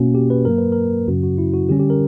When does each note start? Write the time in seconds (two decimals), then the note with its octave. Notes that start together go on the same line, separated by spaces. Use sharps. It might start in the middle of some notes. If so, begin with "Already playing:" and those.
Already playing: B2 A#3 C#4 F#4
0.15 G4
0.30 B4
0.45 G2 F#3 A#3 A#4
0.58 B4
0.72 A#4
1.07 F#2 C#3 F#3 C#4 F#4
1.23 F#4
1.38 E4
1.54 F#4
1.69 D3 G3 C#4 G4
1.79 G4
1.90 A#4